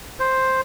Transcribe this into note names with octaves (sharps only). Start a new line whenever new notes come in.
C5